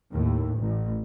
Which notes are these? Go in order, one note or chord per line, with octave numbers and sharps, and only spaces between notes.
D#2 A2
A1